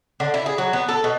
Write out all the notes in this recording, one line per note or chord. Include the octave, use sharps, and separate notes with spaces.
D3
E4
G#4
F#3
B3
A4
B2